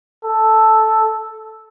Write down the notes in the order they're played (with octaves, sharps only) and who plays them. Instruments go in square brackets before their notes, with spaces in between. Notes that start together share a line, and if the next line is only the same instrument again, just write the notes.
[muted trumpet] A4